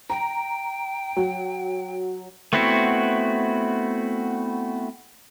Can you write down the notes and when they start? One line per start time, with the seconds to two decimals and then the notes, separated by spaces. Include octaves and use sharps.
0.10 G5 A#5
1.17 F#3
2.53 A3 B3 C4 E4 F#4